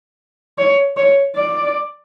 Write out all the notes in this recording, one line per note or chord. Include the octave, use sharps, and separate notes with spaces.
C#5
C#5
D5